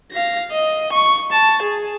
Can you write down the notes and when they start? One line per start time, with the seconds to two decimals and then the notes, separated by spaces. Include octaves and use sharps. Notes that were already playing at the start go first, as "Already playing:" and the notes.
0.11 F5 A#6
0.52 D#5
0.92 C#6
1.32 A5
1.62 G#4